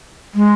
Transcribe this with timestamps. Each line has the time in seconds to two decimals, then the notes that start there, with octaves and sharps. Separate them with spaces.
0.35 G#3